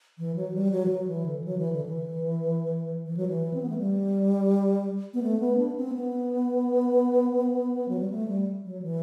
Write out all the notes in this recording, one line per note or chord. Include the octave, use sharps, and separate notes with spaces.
E3
F#3
G3
F#3
E3
F#3
E3
D3
F#3
E3
D3
E3
E3
F#3
E3
C4
B3
A3
G3
B3
A3
B3
D4
C4
B3
F#3
G3
A3
G3
F#3
E3